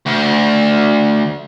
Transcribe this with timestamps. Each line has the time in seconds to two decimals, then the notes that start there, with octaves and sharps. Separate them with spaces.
0.06 D2